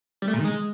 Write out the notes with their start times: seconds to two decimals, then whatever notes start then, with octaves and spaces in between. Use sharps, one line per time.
0.22 G3
0.28 A3
0.33 A#2
0.39 D#3
0.45 G#3